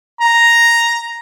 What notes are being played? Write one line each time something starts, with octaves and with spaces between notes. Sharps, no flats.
A#5